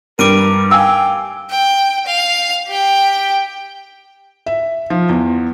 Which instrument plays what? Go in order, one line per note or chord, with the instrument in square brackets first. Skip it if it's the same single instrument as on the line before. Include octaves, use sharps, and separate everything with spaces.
[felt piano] G2 G3 [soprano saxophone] A#4 [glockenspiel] D6 D7 D#7
[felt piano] F5 G#5 [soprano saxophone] G5 [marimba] E6
[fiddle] G5
F5
G4 G5
[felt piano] E5
F3
E2